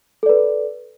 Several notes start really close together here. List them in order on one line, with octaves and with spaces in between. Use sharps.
A4 D5 B4